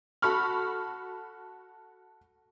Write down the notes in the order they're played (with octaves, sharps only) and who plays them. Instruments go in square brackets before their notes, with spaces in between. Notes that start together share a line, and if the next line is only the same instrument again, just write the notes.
[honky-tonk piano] F#4 A4 B5 C#6 F6